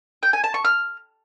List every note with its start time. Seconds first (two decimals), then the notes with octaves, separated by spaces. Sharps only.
0.23 G5
0.33 G#5
0.44 A5
0.54 C#6
0.65 F6